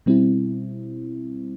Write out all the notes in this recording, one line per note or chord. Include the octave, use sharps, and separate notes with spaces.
B2 G3 C4 E4